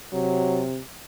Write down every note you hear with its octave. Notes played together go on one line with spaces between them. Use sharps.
C3 F#3